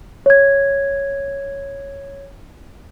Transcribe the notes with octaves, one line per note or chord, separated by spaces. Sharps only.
C#5 G#6